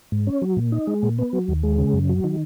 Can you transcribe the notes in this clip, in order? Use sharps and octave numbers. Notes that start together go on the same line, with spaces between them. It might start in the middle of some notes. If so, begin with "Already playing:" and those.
G#2
C#4
F#3
A#2
D#4
G#3
A#2
B3
F#3
D#2
G#3
C#3
F#2
F#3
D#3